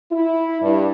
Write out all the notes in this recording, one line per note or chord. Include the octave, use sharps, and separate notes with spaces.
E4
G2